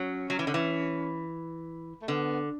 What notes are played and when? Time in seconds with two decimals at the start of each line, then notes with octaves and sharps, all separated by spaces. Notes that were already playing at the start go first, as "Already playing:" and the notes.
Already playing: F#3 C#4
0.30 F#3
0.39 E3
0.47 D3
0.54 E3
2.02 A3
2.08 D3 B3